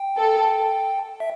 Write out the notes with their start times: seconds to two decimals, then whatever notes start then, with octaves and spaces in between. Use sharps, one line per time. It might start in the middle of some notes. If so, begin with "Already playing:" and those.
Already playing: G5
0.17 A4
1.20 E5